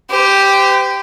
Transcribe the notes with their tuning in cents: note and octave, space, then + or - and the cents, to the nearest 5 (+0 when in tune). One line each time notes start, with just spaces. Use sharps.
G4 +0 C5 -40